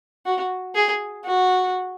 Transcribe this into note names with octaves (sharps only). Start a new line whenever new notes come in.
F#4
G#4
F#4